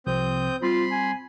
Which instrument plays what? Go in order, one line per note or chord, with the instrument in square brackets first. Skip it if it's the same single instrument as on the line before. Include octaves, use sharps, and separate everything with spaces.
[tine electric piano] C2 C3 F3 [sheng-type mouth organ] C4 D#6 G6
[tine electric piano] G3 C4 [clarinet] F4 [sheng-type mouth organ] B5 C6
[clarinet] G#5